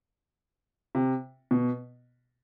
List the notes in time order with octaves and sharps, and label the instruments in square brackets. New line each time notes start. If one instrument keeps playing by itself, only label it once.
[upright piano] C3
B2